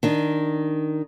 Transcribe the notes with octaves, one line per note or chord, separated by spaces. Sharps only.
D#3 D4